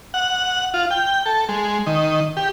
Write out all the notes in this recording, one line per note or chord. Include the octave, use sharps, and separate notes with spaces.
F#5
F4
G5
A4
G#3
D#3
G4